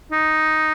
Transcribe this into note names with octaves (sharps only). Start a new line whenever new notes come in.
D#4